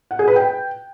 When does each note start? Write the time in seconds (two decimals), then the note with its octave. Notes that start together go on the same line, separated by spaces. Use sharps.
0.11 F#5
0.19 G#4
0.28 B4
0.36 G5